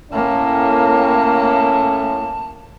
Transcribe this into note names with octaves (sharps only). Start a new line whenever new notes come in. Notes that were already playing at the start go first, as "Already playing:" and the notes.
A2 A#3 C#4 A5